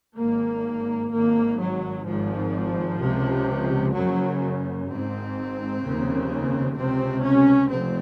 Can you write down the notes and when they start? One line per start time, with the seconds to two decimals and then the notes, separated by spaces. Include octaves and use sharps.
0.17 G#1 G#2 A#3
1.11 G#1 G#2 A#3
1.58 F#3
2.06 G#1 G#2 F3
3.00 C#2 C3
3.94 F#1 F#2 C#3 F#3
4.88 G#1 G#2 C4
5.82 F1 D#2 C#3
6.75 C#2 C3 C4
7.23 C#4
7.70 F1 C4